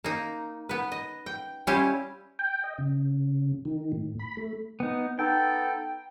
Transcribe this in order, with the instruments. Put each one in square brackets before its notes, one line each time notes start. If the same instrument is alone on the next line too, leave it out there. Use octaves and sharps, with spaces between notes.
[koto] A#3 D#4
B3 B4
D#5
G5
G3 C#4 E4 F4 G4
[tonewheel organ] G5
D#5
C#3
D#3
A2
B5
A3
[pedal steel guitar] B3 D#4
[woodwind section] B3 D#4 A4 [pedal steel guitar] G5